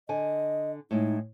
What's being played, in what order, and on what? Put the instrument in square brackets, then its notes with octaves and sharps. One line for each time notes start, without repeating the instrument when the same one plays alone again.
[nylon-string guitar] D3 G#5 [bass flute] D#5
[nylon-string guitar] A2 G#3 [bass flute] D#4